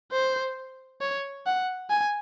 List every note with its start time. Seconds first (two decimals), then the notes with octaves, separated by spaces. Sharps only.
0.12 C5
1.01 C#5
1.46 F#5
1.90 G#5